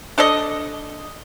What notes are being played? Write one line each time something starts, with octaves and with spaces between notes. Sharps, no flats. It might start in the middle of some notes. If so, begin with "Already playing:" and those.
D4 A4 D5 D#5